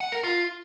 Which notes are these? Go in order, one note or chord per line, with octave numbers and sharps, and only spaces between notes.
F#5
A#4
F4